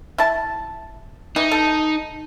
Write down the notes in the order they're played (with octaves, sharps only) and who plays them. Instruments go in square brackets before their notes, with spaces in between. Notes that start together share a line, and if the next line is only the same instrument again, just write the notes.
[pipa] E4 A5
[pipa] E3 [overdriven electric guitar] D#4
[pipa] A4